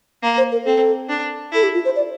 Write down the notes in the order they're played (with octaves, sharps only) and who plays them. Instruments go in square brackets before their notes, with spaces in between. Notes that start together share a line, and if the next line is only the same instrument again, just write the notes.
[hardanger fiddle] A#3
[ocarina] C5
A#4
[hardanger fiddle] C4 [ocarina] A4
[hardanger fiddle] D4
[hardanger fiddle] E4 [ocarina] A4
[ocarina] G4
F4
C5
D5